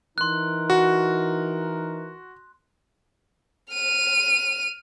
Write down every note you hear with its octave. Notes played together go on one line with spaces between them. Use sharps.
E3 D#4 A#4 C6 F#6
F#4
F6 D#7